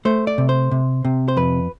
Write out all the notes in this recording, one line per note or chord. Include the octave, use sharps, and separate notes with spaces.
A3 C5
D5
C3
C5
C3
C3
C5
F2 B4